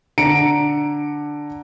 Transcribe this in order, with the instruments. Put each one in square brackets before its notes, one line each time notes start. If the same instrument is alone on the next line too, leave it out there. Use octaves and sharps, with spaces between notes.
[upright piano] D3 A#5 C#7 D7